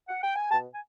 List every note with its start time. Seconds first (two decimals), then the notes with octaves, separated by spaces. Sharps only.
0.08 F#5
0.22 G5
0.36 G#5
0.50 B2 G5 A5
0.73 G#5